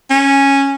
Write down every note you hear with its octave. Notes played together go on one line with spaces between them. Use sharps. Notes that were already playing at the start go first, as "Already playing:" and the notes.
C#4